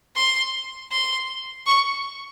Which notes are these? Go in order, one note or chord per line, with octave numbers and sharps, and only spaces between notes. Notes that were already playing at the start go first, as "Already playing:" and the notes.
C6
C6
C#6